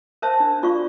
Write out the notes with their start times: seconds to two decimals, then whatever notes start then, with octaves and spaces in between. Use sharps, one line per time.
0.22 A#4 C5 C#5 E5 A5
0.40 D4
0.63 F4 D5 F5 C#6